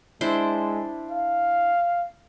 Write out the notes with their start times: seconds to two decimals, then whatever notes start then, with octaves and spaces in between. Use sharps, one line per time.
0.21 G#3 D4 E4 C5
1.11 F5